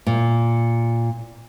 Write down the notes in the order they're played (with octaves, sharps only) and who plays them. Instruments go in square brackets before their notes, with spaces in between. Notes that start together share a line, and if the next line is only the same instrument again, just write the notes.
[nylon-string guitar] A#2